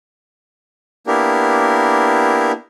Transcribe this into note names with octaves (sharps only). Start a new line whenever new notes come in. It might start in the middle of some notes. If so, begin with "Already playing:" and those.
A#3 B3 D4 E4 G4 A#4